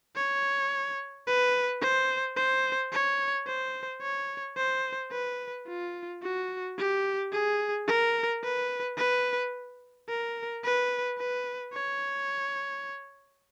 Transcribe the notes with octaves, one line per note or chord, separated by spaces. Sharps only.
C#5
B4
C5
C5
C#5
C5
C#5
C5
B4
F4
F#4
G4
G#4
A#4
B4
B4
A#4
B4
B4
C#5